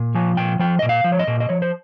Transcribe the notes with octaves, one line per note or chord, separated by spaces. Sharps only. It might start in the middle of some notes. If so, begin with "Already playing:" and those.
Already playing: A#2
F3 G#5
A#2 G5
F3 G5
A#2 D#5
F5
F3
C#5
D#5
A#2
D#5
F3 C#5
C5